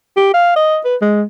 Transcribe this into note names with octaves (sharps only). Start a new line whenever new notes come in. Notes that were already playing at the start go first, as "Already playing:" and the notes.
G4
F5
D#5
B4
G#3